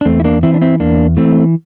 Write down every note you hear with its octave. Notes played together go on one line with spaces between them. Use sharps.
D4
E2 A3 C4
E4
A#3 D4
E3 C4 E4
D4
C4 E4
E2 A#3 D4
E3 A3 C4